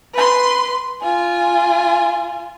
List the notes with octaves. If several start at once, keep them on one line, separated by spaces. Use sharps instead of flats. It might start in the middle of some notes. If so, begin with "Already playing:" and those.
B4 C6
F4 G#5